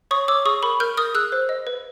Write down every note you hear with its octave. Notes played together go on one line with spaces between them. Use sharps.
C#5 C#6 D#6
C#5 D6 E6
G#4 C#6 D#6
A#4 B5 C#6
A#4 F6 G6
A#4 D#6 F6
G#4 E6 F#6
C5
D#5
B4